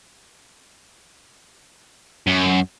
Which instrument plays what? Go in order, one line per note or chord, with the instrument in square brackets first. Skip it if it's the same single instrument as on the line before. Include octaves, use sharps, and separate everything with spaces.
[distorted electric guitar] F#2